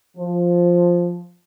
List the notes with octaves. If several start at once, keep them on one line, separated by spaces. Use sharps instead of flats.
F3